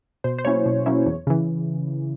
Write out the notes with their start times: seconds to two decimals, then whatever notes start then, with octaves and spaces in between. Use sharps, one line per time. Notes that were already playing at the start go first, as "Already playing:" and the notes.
0.24 B2 C5
0.38 C5
0.45 F#3 A#3 C#4 E4 C#5
0.66 B2
0.86 F#3 A#3 C#4 E4
1.06 E2
1.27 C#3 E3